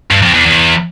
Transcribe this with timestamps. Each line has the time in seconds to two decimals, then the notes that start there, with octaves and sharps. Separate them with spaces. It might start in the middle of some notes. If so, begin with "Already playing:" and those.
0.11 G2
0.22 F2
0.34 E2
0.46 E2